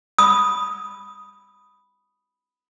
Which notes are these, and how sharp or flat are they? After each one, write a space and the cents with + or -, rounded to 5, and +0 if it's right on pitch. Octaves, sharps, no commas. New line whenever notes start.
B5 +0 D#6 +0